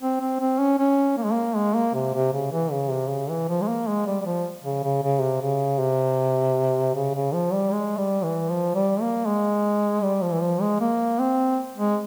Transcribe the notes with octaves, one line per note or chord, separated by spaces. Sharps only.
C4
C4
C4
C#4
C#4
A#3
G#3
A#3
G#3
A#3
C3
C3
C#3
E3
C#3
C3
C#3
E3
F3
G#3
A#3
G#3
G3
G3
F3
C#3
C#3
C#3
C3
C#3
C3
C#3
C#3
F3
G3
G#3
G3
E3
F3
G3
A#3
G#3
G3
F3
E3
F3
G#3
A#3
C4
G#3